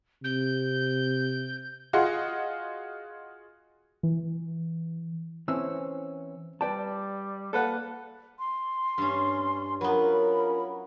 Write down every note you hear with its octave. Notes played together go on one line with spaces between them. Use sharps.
C3 G6
F4 F#4 G#4 D#5 F#5 C6
E3
E3 C4 C#4 E6
G3 B4 D5 G5 A5
A#3 A4 B4 F#5
C6
G2 C#4
F#3 B3 C#4 F4 A#4 B5